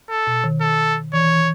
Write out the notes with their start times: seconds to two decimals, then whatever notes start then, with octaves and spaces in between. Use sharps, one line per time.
0.10 A4
0.27 B2
0.44 D#3
0.61 A4
1.13 E3 C#5
1.30 E3